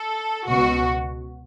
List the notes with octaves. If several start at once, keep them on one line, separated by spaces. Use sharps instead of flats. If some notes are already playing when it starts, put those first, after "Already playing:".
Already playing: A4
C#2 B2 F#4